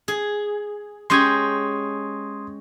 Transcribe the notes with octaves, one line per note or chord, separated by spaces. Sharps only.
G#4
G#3 C#4 G4 C6 D#6 G#6